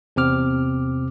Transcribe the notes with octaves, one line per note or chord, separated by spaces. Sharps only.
E2 C3 C4 D6 F6